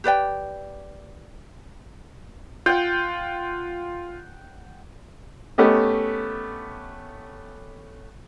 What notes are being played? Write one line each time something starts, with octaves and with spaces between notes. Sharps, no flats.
G4 B4 D5 G5
F4 F#5 G5
A3 B3 C#4 G4 D#5